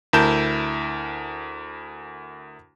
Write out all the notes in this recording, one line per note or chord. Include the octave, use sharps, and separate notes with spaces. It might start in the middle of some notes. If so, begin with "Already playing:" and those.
D2 E4 A#4 A5 G6 E7